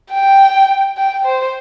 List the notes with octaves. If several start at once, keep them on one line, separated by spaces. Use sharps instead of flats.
G5
G5
C5